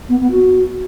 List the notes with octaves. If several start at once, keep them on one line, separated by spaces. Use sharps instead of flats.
B3
B3
F#4